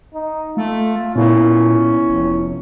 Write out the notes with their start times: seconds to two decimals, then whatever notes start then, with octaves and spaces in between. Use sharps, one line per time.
0.14 D#4
0.57 A3 F4
1.16 A#2 B3 C#4 E4
2.10 F1